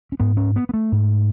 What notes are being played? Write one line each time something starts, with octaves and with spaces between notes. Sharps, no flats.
C#4
G#2 B3
C#4
B3
B3
A3
G#2